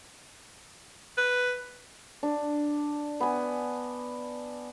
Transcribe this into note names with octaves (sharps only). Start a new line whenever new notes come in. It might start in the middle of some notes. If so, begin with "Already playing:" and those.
B4
D4
B3 G#5